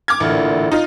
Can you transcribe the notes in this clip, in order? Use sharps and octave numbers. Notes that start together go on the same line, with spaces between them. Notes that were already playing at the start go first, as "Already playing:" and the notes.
D6 F6 G#6
A1 A#2 D3 E4
D#4 F4